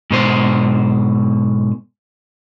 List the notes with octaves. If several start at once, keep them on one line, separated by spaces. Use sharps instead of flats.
G#2 B2 C5